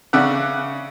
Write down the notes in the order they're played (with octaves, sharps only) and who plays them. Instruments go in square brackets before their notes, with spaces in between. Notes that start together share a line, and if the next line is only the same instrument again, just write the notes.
[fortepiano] C#3 D5 E5 F#5